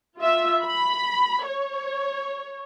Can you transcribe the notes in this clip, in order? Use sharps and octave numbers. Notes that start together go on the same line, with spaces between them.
F4 E5
B5
C#5